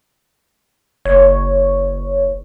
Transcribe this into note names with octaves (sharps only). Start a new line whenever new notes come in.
F#1 C#5